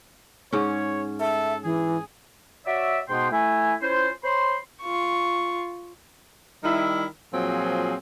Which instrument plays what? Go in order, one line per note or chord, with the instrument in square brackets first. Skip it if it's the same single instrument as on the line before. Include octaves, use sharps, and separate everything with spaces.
[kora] G#2 C#4 [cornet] C#5
[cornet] A4 [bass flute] E5
[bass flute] E3 [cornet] G#4
[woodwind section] F#4 C#5 D5 E5
G#2 B2 B3 G5 C6
A3 E4 G#5
C#4 E4 F4 C5
C5 C#5 B5 C6
[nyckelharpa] F4 C#6
[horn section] D#3 G3 D#4 E4
A#2 F3 F#3 C4 G#4